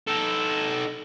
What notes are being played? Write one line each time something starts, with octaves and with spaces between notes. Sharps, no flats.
D#4 A4